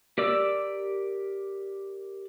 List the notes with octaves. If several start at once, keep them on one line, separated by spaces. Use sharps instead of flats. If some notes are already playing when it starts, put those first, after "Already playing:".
G4 A#4 D5 D6 E6